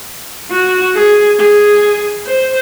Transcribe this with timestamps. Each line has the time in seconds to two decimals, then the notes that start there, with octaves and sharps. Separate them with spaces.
0.51 F#4
0.95 G#4
1.40 G#4
2.27 C5